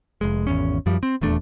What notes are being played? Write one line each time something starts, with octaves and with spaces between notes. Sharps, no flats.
F1 G#3
G#1 E2 C#4
F#2 F3 G3
C4
D#1 E2 A3 D4